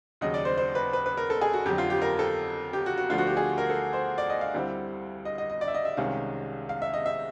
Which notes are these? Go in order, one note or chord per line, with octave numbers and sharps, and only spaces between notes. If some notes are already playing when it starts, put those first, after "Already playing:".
D#2 C#3 F#3 D#5
D5
C5
C5
B4
B4
B4
A#4
A4
G#4
F#4
F2 D3 F#3 G4
F4
G4
A#4
A4
G4
F#4
F#4
D2 D3 F3 A3 D4 F4
F#4
G4
G#4
A#4
A4
C5
D5
D#5
F5
D2 D3 G3 C4 E4
D#5
D#5
D#5
D5
E5
D#5
E5
C2 C3 D#3 G#3 C#4 F5
F5
E5
D#5
E5